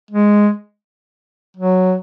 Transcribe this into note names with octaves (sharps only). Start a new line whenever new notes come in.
G#3
F#3